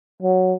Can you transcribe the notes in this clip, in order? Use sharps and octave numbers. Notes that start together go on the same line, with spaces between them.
F#3